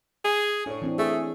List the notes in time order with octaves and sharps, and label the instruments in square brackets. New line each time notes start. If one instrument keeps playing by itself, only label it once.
[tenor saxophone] G#4
[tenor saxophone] A2 [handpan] D4 C#5
[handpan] E3 C4 D4
[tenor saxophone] A3 [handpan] G#4